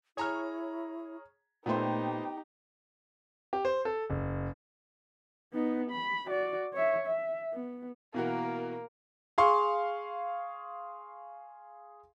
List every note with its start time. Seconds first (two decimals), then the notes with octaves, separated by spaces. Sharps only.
0.17 E4 G#4 C#5 A#5 F6
1.66 A#2 A3 B3 D#4 G4 C5 G5
3.53 G4
3.65 C5
3.85 A4
4.10 F#1
5.54 B3 D#4
5.91 B5
6.27 F#4 D5
6.74 C#5 E5
7.07 E5
7.53 B3
8.14 B2 E3 A#3 F#4 A#4
9.38 G#4 F5 C6 C#6